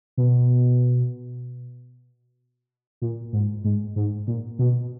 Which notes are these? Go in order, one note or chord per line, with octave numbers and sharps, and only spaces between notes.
B2
A#2
G#2
G#2
G#2
A#2
B2